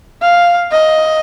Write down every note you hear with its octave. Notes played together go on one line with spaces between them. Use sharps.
F5
D#5